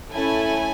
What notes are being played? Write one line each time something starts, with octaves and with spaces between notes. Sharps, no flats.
A3 C#4 E4 A4 G#5